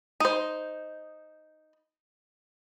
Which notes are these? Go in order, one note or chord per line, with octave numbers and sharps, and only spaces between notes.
D#4 C5